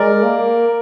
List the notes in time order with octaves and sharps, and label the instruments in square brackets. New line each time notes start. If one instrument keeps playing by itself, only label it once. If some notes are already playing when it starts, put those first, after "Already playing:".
Already playing: [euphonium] G#3 [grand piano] A#4 D5
[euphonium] A#3